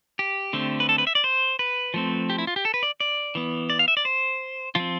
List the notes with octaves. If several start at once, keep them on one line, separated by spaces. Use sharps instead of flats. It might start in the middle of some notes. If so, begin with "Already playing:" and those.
G4
D3 A3 C4
B4
A4
B4
E5
D5
C5
B4
F3 A3 C4
G4
E4
F4
G4
A4
B4
D5
D5
E3 B3
D5
F5
E5
D5
C5
F3 C4 F4